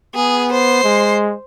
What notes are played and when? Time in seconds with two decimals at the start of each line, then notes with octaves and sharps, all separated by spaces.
0.15 B3 G#4
0.52 C5 C7
0.84 G#3